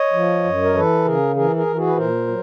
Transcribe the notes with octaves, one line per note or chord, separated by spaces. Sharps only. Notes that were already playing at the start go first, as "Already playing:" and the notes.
Already playing: C#5 D#5
F3
F#2
A#4
E3 A4 B4
C#3 G#4 A#4
E3 G#4 A#4
G#4 A#4
E3
F#4 G#4
B4
A#2 A#4 C5
F#3